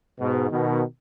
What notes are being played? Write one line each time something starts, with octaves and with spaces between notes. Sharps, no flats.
G#2 B2
B2 D#3